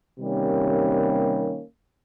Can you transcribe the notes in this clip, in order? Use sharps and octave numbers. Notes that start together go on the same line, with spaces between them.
C3 D#3 G3 A#3 C#4